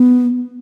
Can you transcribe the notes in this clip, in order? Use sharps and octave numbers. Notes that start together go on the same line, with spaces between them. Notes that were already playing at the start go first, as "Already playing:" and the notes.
Already playing: B3